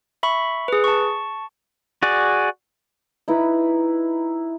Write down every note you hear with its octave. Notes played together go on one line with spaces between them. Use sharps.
E5 B5 C#6
G#4 B4
A5 C#6
F#4 G#4 D5
D#4 E4 B4